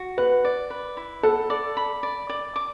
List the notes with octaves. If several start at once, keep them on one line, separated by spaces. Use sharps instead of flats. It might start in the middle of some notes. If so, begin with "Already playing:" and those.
Already playing: F#4
B4 F#5
D5
B4
E4
A4 F#5
D5
B5
D5
D5
D6